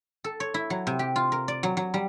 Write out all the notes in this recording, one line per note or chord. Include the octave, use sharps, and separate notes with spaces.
A4
C#5
E4
F#3
C3
G4
F4
A#4
D5
F#3
F#3
G3